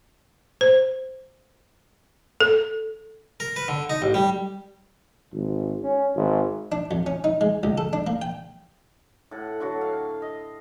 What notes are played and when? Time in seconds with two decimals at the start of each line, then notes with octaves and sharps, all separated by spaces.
0.61 C5
2.41 A4
3.40 A#4
3.56 B4
3.68 D3
3.90 D#4
4.02 A1
4.14 G3
5.33 G#1
5.83 C#4
6.16 G#1
6.72 D4
6.91 F2
7.06 C#4
7.24 D#4
7.41 G#3
7.63 C#2
7.78 A4
7.93 D4
8.07 A#3
8.22 G5
9.31 A2 F#5
9.60 D3 F#3 F#4
9.81 F5
10.22 D#5